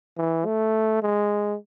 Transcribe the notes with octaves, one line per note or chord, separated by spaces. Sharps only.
E3
A3
G#3